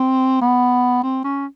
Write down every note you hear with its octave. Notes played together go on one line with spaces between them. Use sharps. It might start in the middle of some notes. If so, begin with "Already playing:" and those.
Already playing: C4
B3
C4
C#4